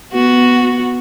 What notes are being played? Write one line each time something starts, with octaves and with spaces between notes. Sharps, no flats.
B3 F#4